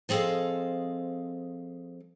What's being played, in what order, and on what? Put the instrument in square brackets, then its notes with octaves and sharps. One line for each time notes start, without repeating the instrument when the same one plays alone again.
[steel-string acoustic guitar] F3 C4 G#4 A4 D#5 F5